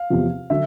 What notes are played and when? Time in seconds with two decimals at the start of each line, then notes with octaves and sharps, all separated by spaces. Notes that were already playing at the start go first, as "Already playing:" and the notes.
Already playing: F5
0.10 E2 C3 F3
0.50 D3 F#3 E5